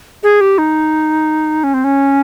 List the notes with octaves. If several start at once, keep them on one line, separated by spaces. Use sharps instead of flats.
G#4
G4
D#4
C#4
C4
C#4